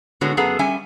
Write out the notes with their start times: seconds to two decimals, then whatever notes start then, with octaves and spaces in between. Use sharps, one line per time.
0.21 A2 D3 G#3 B3 F#4 C#5
0.37 F#2 B3 G#4 A4 F#5 A#5
0.59 G3 C#4 E5 G#5